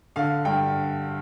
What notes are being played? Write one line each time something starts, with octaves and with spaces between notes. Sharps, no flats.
D3 F5
G2 G5